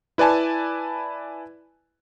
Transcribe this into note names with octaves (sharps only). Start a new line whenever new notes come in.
E4 B4 D5 G#5 A5